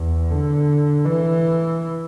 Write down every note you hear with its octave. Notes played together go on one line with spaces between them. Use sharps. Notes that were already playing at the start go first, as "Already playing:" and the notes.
Already playing: E2
D3
E3